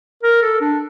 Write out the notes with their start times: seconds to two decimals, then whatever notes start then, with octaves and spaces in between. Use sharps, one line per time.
0.23 A#4
0.42 A4
0.61 D4